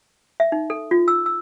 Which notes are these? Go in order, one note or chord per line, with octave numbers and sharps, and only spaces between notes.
E5
D#4
A4
F4
E6
E6